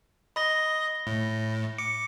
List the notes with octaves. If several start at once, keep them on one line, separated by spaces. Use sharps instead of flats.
D#5 B5 A#6 G7
A2
D6 C#7